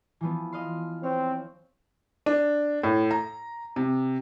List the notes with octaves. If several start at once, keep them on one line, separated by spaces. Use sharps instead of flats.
E3 F3 B3
D#5 F5 C6
C4 C#5
D4
A2
A#5
C3